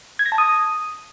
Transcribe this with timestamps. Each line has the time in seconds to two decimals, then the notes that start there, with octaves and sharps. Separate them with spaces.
0.19 G#6
0.26 A#6
0.32 A5
0.38 D#6